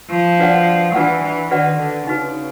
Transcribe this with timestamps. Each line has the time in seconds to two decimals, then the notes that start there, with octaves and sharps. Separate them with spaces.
0.10 F3
0.39 D4 F#4 B4 D5 F#5
0.94 E3 D4 F#4 B4 D5 F#5
1.23 E3
1.51 D#3 D4 F#4 B4 D5 F#5
1.79 D3
2.07 C#3 D#4 F#4 B4